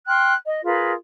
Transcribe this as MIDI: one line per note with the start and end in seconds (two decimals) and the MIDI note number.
0.07 0.33 79
0.07 0.33 84
0.07 0.33 89
0.07 0.33 90
0.45 0.59 75
0.64 0.92 65
0.64 0.92 68
0.64 0.92 70
0.64 0.92 71